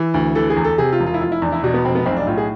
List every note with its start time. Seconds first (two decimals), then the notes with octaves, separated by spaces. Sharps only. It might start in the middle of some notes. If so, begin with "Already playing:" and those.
Already playing: E3
0.14 D2
0.35 E3 A4
0.50 G#4
0.57 E2
0.64 A4
0.78 C3 G#4
0.92 F4
1.00 E1
1.06 F4
1.14 E4
1.21 F1 F4
1.32 E4
1.42 E2 D4
1.52 E4
1.63 B2 D4
1.74 B3
1.84 F1 C4
1.95 B3
2.06 B1 C4
2.17 D4
2.27 A2 F4
2.37 G#4